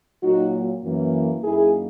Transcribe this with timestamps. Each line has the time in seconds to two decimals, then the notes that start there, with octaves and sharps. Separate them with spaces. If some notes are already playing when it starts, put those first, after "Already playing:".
0.23 A#2 F#3 A#3 D#4 F#4
0.83 F#2 E3 A#3
1.43 F#2 D#3 A#3 E4 G#4